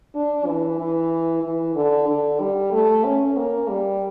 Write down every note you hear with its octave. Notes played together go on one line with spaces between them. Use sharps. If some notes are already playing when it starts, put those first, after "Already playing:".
D4
E3
E3
E3
D3
D3
G3
A3
C#4
A#3
G3